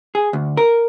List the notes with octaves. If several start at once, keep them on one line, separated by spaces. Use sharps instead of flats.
G#4
D2
A#4